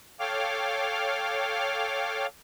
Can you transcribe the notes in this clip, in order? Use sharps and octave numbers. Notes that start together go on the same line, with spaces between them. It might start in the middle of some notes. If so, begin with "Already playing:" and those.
A4 C#5 F5 G5 D6 F6